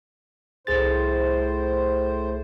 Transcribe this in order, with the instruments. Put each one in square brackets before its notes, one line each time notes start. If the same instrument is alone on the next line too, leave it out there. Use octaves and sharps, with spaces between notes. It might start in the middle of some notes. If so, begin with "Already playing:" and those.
[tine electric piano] C2 G#4 A6 [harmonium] A2 C5